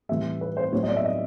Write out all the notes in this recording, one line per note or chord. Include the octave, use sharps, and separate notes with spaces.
A2 E3 G3 E5
B4
C5
A2 F#3 B3 C#5
D#5
D5
E5
D#5